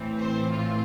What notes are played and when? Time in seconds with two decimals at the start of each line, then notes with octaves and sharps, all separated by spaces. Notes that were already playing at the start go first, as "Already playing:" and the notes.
Already playing: A2 E3 A3 C4
0.22 C5
0.53 F4